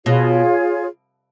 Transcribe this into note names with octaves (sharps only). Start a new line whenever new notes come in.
B2 F4 G#4 C#5